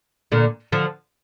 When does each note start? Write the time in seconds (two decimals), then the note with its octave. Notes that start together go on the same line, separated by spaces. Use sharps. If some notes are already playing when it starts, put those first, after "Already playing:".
0.32 A#2 D3
0.72 D3 F3